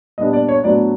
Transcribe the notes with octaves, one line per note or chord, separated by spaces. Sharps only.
A#2 G3 B3 D4 D#5
D5
C#5
A2 F#3 B3 D4 D5